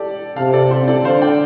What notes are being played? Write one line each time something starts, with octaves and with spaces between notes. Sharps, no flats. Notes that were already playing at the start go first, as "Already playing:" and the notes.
Already playing: G4 A4 D5
C3 F5 A5
A4 D5
G4 C5
A4 D5
D3 C5 F5
D5 G5